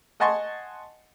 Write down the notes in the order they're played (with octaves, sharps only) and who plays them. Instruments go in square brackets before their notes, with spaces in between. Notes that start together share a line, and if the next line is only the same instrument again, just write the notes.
[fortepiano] D#5 F#5 G#5 A5 C6 C#6